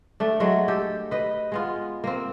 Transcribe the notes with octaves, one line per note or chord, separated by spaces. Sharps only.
A3 D4
F#3 G#3 A3 F#4
G4 A4
B4 D#5
G#3 B3 F4
A#3 C4